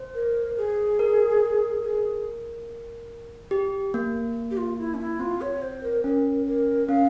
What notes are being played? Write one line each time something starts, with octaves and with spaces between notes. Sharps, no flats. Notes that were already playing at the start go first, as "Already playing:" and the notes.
Already playing: C5
A#4
G#4
A#4
G#4
G4
A#3
G4
F4
E4
C#4
E4
C4 F4
C#5
C5
A#4
C#4 A#4
A#4
C#4 F5